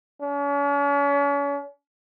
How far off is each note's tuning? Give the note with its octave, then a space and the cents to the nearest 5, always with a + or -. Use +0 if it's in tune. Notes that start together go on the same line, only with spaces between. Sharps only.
C#4 +40